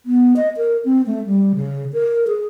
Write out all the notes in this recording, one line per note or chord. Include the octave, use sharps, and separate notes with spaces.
B3
D#5
A#4
C4
A3
G3
C#3
A#4
G#4